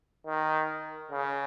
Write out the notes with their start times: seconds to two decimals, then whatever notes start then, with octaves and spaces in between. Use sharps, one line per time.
0.27 D#3
1.11 C#3